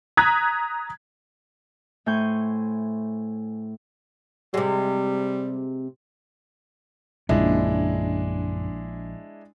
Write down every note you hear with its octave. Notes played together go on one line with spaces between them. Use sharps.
A#5 D#6 F#6 G#6 B6
A2 C5 G#5 C#6 G6
C3 G3 G#3
A#1 F#2 C#3 G#3 C#4 D4 E4